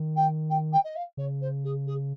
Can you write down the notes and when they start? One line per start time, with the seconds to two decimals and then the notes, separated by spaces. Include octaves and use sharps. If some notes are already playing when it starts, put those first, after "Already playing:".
Already playing: D#3
0.15 G5
0.49 G5
0.72 G5
0.83 D#5
0.95 F5
1.17 C#3 C#5
1.41 C5
1.64 G#4
1.86 G#4